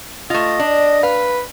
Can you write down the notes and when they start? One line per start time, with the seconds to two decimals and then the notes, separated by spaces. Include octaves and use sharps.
0.30 A3 F4 D#5
0.59 D4
1.03 B4 F5